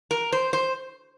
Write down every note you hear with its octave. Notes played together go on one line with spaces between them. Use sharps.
A#4
C5
C5